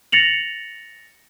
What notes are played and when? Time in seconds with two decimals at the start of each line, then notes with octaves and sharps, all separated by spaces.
0.12 A6 A#6 C#7 F7 F#7